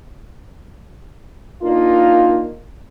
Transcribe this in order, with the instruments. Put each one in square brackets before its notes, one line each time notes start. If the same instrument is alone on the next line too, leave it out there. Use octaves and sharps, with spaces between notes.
[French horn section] A#3 D4 D#4 F4